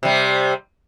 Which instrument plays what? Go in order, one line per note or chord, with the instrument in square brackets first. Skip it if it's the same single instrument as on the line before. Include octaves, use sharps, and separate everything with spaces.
[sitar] C3 G3